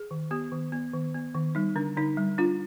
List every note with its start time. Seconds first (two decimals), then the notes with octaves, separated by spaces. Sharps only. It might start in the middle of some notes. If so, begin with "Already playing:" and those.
Already playing: G#4
0.11 D#3
0.31 B3 G4
0.52 D#3
0.72 B3
0.94 D#3
1.15 B3
1.34 D#3
1.55 G3 D#4
1.76 D3 D4
1.97 D3 D#4
2.17 G3
2.38 D4 F4